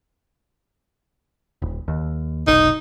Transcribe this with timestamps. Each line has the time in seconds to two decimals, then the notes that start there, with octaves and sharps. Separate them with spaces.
1.62 D#1
1.88 D#2
2.47 F1 B1 D#4